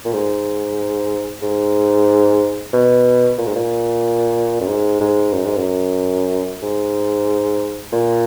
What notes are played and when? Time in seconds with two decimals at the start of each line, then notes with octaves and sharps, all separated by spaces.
0.05 A#2
0.13 G#2
1.42 G#2
2.73 B2
3.38 A#2
3.47 G#2
3.55 A#2
4.61 F#2
4.68 G#2
5.01 G#2
5.32 F#2
5.45 G#2
5.56 F#2
6.63 G#2
7.93 A#2